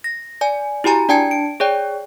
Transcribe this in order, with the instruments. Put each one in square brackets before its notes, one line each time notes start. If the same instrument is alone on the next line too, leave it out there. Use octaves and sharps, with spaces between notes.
[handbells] A#6
D5 G#5
E4 F#4 G4 G#5 A#5
D4 D5 G5 A5 G#6 C#7
D7
G#4 C#5 D5 G5